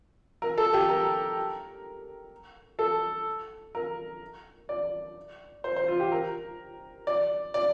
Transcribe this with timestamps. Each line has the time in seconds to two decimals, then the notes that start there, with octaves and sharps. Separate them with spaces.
0.42 A#4
0.58 A4
0.73 G4
0.89 A#4
2.79 A4
3.75 A#4
4.69 D5
5.64 C5
5.76 C5
5.88 F4
6.00 G4
6.12 A#4
7.07 D5
7.54 D5